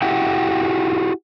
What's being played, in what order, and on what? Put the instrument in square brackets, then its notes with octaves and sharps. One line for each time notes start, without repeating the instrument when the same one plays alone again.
[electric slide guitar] E4 F#4 G4 F#5 G5